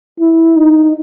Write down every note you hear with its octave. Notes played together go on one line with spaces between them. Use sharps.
E4
D#4